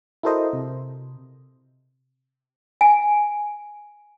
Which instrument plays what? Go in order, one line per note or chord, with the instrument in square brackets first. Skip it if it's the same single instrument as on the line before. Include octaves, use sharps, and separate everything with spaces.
[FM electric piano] E4 F#4 A4 A#4 C5 D#5
C3
[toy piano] G#5